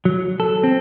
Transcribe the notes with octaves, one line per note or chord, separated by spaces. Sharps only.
F#3
A4
C4